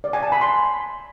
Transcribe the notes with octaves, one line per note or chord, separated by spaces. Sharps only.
D5
G#5
A5
B5
C6